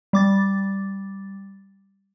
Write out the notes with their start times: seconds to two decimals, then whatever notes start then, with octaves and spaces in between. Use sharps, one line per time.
0.13 G3 D6 A6